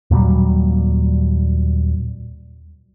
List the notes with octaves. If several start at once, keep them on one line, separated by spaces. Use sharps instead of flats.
D#2 A#2 F#3 G3